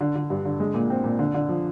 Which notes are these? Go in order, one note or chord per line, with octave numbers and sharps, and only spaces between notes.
D3
D3
G2
D3
G#3
A#2
C4
A#2
D3
D3
F3